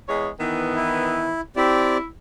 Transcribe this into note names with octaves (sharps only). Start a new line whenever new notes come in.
E2 G#3 C#5
D#3 E3 B3
E4
C4 E4 G4 D5